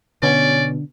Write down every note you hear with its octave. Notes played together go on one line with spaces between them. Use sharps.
B2 D3 C#4 D5